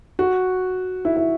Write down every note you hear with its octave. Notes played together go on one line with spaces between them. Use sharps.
F#4
E4
E4